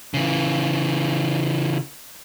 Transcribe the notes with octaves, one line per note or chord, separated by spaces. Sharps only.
C#3 E3